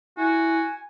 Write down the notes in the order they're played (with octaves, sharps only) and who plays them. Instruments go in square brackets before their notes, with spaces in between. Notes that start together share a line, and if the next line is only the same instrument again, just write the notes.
[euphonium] E4 [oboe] F#4 [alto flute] G#5